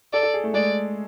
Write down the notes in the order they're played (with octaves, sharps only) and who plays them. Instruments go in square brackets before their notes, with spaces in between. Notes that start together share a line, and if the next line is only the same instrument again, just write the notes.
[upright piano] A4 [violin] D5
[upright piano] A4
G#4
A3
[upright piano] G#3 [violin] D5